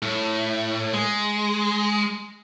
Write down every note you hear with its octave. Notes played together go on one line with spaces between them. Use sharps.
A2
G#3